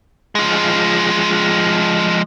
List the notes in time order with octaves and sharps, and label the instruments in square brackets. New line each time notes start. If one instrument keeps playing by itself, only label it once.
[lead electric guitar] F3 G#3